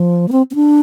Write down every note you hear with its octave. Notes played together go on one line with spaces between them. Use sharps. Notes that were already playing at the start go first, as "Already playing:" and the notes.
Already playing: F3
A#3
C4
C4
D4